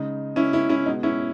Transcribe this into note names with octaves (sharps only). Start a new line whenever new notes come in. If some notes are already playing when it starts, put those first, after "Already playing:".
Already playing: C#3 G#3 D#4
C#4 E4
C#4 E4
C#4 E4
B2 G#3 D#4
C#4 E4